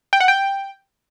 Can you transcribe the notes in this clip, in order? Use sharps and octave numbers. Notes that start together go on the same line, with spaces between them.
G5
F#5
G5